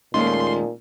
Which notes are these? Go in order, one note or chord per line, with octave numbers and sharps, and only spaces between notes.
D#2 A#2 G#3 A3 C#4 D#4 F4 C6